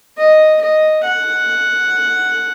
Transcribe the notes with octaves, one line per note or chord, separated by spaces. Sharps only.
D#5
D#5
F#5